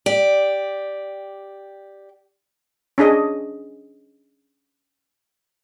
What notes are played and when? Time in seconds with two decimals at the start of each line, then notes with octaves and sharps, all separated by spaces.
0.06 G4 D5
2.98 C#4 D4 G#4 D#5